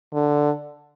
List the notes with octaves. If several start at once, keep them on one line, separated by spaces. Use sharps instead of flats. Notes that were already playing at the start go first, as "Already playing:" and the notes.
D3